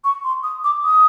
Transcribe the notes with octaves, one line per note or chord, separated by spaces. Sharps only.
C#6
C6
D#6
D6
D#6